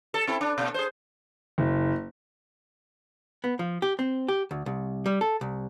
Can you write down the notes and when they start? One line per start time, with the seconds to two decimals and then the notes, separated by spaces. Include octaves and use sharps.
0.14 A4
0.27 C4 E4 A4
0.41 D4
0.58 B2 A#3
0.74 G#4 C5
1.58 F#1
3.44 B3
3.59 F3
3.82 G4
3.99 C4
4.28 G4
4.51 D2
4.66 C2
5.06 G3
5.21 A4
5.41 C2